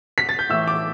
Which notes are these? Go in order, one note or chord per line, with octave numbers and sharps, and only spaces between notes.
B6
A6
G6
A2 E3 A3 E6
D6